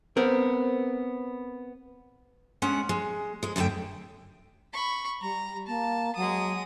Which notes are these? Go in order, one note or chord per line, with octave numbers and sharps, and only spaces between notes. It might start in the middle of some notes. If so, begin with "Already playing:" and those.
B3 C4 A#4
G#3 C#4 D4 F#5
G#3
D2 G#3
F#2 B2 D3 A3 G5
B5 C#6
G3 A#5
A#3 A5
F#3 G#3 D#6